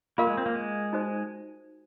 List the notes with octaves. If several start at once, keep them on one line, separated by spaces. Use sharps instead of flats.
A#3 F4 A#4 F5 C6
G#3
C4
A#3
G#3
D#4 F#4 C5